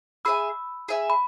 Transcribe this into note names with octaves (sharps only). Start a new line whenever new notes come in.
G#4 E5 G#5 B5 E6
G#4 E5 G#5
B5